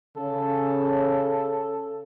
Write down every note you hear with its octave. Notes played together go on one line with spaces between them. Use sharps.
C#3 A4